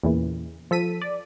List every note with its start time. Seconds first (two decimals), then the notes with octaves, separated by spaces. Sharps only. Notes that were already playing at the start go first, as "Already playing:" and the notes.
0.03 E2 A#2 C#3 E3
0.71 F3 A4 B6 D#7
1.02 D5